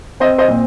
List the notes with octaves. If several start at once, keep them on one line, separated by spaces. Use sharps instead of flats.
C4 C5 D#5
C5 D#5
A#2